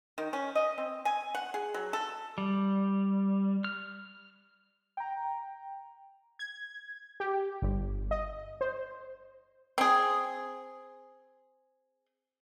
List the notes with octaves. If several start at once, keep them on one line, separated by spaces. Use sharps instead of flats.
D#3
C#4
D#5
C4
G#5
F#5
G#4
F#3
A4
G3
F6
G5 A#5
G#6
G4
G1
D#5
C5
C4 G#4